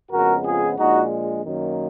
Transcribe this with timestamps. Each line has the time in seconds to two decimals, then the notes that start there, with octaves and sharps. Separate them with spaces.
0.11 F2 C#3 G#3 B3 F#4 A#4
0.44 F4 G#4
0.77 A#1 A#2 G#3 D#4 F#4
1.43 F#2 D#3 A#3